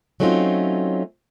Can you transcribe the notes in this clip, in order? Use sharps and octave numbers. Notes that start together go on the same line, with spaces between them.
F#3 A3 C4 C#4 D#4 F4